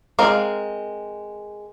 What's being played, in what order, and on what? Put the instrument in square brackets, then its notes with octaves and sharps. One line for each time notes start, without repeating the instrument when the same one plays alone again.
[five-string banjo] G#3 C4 A#4 F5